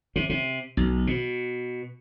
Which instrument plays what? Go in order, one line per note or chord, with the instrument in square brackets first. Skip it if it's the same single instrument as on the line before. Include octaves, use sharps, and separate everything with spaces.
[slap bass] C3
C3
B1
B2